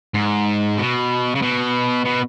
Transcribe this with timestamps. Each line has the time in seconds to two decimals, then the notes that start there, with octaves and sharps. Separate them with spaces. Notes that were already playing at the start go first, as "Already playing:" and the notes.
0.14 G#2
0.77 B2
1.35 C#3
1.42 B2
2.05 B2